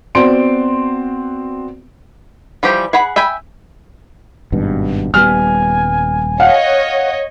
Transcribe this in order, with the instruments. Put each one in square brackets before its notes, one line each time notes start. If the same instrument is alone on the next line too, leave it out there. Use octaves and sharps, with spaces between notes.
[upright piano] B3 C4 F#4 D5 C6 D7
[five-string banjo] E3 F3 G3 G4
G#4 F#5 B5
E5 G5 G#5 B5
[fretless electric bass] G#1 G2 B2
[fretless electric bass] D#1 G3 B3 [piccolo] G#5 [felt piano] F6
[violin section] C#5 D#5 [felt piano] F5 F#5